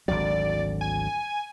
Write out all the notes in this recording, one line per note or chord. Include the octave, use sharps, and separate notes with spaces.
G#1 D2 F#3 D5
G#5